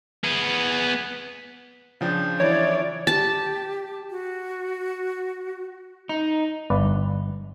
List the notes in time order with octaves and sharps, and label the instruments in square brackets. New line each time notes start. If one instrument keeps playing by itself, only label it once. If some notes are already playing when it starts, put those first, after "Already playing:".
[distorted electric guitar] B3 G#4
[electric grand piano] C#3 F3 D4 [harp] G5 G6
[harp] E3 [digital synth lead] C#5 [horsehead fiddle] D5
[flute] G4 [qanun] A5
[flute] F#4
[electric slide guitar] D#4
[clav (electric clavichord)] G1 B4 D5